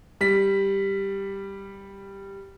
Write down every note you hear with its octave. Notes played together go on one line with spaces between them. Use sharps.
G3 B6